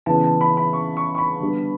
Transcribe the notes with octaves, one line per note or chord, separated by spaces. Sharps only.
C#3 E3 B3 A5
A5
B5
B5
C#6
C#6
C#6
B5
D3 G3 B3